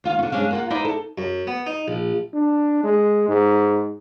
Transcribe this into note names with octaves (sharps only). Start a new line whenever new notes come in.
D#2 F4 F5
D3 C#4
G2 B2 G#3 C#4 D4 F5
A#3 F4 F#5
D#4 E4 B4 C5 D5 E5
A4
F#2
B3
D#4
A#1
D4
G#3
G#2